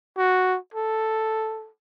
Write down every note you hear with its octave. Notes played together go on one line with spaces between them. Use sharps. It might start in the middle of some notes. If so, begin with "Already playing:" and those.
F#4
A4